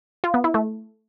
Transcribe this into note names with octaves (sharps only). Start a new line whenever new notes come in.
F4
B3
E4
A3